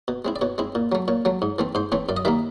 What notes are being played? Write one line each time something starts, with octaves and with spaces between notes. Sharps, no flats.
B2
G#3 C4 E4
D5
B2 C#5
G#3 C4 E4
A#2
F#3 A3
A#2 C#5
F#3 A3
G#2
E3 A3 C4
G#2 C5
E3 A3 C4 C#5
F#2 D5
D#5
D#3 G3 A#3 E5